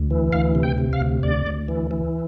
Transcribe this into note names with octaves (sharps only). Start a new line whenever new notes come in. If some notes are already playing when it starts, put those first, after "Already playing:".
Already playing: D2
E3
D2 F5
C3
G5
C3
F5
D2
D2 D5
D2
E3
E3